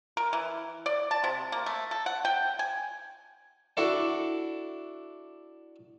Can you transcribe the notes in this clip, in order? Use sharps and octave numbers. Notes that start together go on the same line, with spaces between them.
A#4
E3
D5
A5
C3
A#3
A3
A4
F#5
G5
G#5
D4 E4 F#4 A4